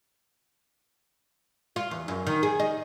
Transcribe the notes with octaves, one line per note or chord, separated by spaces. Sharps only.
F4
E2
F#2
D#3
G#4
D#4